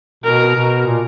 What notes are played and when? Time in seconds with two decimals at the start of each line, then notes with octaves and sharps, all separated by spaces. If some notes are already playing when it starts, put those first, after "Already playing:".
0.24 B2 A#4
0.55 B2
0.86 A#2